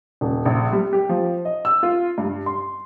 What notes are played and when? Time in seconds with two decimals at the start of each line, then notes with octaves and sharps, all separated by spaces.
0.21 D#1
0.45 A#1
0.73 G3
0.93 G4
1.09 F3
1.45 D#5
1.65 E6
1.83 F4
2.18 G2
2.46 C6